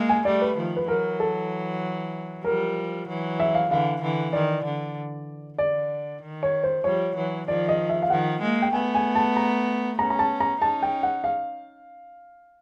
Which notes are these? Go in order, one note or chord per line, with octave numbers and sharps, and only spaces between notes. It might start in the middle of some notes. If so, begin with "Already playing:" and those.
Already playing: G#3 A#3
G#5
G3 A3 D5
B4
D#3 F3
B4
E3 F#3 A#4
A4
F3 G3 A#4
E3 F#3
E5
F5
D3 E3 F5
D3 E3
D#3 D5
D3
D3 D5
D#3
C#5
C5
F3 G3 C#5
E3 F#3
D#3 F3 D5
D#5
E5
F5
D#3 F3 F#5
G#3 A#3
G5
A3 B3 G#5
G#5
A5
A#5
B3 C#4 A#5
A#5
A5
A#5
C#4 D#4 A5
G5
F#5
F5